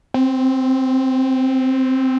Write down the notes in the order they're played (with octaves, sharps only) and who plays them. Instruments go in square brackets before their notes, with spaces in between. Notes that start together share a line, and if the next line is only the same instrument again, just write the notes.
[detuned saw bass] C4